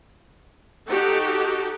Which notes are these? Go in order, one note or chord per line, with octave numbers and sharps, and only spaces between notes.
D#4 F#4 G4 A4